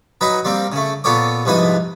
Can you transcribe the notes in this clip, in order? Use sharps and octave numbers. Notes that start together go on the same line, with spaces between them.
F#3 D#4 B4 D#5
G3 A#3 C4
C#3 A3
A#2 B3 A4 C#5 D6
C2 G#2 F3 B4 G#5 D#6